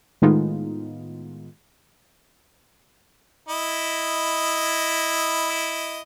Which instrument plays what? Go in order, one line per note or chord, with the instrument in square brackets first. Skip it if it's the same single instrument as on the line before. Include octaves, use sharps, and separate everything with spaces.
[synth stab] A2 D#3 G#3 B3 D#4 F4
[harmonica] E4 D#5